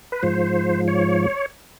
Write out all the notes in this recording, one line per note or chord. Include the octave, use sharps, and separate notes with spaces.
B4
G#2 F3 C5
C#5